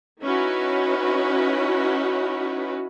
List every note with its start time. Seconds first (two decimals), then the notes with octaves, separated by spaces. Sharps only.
0.23 C#4 D#4 E4 F#4 B4